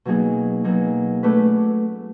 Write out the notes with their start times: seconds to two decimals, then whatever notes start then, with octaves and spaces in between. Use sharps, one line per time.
0.05 B2 F#3 A#3 D#4 G#4
0.64 B2 F#3 A#3 D#4 G#4
1.23 A3 C#4 F#4 B4 D5